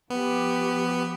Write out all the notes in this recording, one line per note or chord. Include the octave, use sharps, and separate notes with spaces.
F3 B3 G4